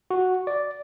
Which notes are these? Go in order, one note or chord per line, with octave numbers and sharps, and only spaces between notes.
F#4
D5